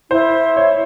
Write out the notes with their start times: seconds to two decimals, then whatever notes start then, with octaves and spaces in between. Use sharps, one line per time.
0.11 E4 C5
0.56 C#5